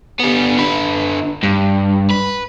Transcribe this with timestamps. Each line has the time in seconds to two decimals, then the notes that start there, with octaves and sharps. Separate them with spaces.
0.20 G3 B3
0.58 D3 B4
1.43 G2
2.10 B4